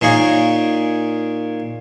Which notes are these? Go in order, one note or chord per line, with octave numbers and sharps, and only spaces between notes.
A#2 A#3 D#4 G#4 C#5 A#5